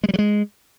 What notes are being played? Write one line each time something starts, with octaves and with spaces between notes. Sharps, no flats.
G#3
G3
F#3
G#3